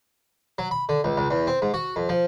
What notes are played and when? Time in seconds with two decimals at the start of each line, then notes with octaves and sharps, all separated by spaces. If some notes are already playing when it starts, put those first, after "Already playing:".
0.58 F#3
0.71 B5
0.89 D3
1.04 C#2
1.17 C#2
1.30 E2
1.47 C4
1.62 G#2
1.74 F#4
1.96 F2
2.09 F3